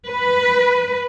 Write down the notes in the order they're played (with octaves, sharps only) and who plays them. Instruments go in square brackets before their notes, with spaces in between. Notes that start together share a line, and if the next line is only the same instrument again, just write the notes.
[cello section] B4